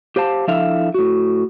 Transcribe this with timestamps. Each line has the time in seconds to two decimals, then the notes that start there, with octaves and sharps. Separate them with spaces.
0.16 G4 C5 F5 A5
0.48 F3 D4 E4 A4 E5 F5
0.94 A2 F#4